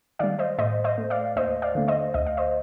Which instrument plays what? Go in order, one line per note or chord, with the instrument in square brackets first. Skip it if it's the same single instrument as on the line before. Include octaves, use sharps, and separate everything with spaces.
[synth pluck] D#3 G3 D5 F5
C5 D#5
A2 C5 D#5
C5 D#5
A3
D5 F5
D#2 C5 D#5
D5 F5
D3 A3
C5 D#5
D2 D#5
F5
C5 D#5